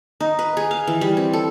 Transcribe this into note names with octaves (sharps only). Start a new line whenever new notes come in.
D#4
B4
G#4
F5
E3
G3
C4
A4